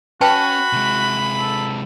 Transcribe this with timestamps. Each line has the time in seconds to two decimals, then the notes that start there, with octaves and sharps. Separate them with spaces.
0.21 C#4 F#4 B4 G5 A5 B5
0.73 C3 G#3
1.39 A4